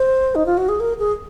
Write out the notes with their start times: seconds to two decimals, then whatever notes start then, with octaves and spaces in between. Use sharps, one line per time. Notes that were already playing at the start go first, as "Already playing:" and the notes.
Already playing: C5
0.35 D#4
0.46 F4
0.57 F#4
0.69 G#4
0.80 A#4
0.99 G#4